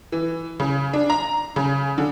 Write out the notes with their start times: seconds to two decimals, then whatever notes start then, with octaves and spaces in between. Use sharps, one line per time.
0.12 E3
0.60 C#3
0.93 D4
1.10 A#5
1.56 C#3
1.98 D3